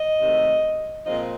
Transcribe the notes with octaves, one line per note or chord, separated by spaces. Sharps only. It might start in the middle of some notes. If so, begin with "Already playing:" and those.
Already playing: D#5
C3 D#3 F#3 A3
A#2 F3 G#3 C4 D#5